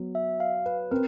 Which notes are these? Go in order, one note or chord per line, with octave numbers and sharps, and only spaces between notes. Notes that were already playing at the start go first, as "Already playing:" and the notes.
Already playing: F#3 B3
E5
F5
B4
C4 A#4